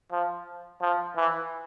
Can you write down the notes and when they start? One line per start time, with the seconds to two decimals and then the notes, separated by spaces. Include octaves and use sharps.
0.12 F3
0.81 F3
1.16 E3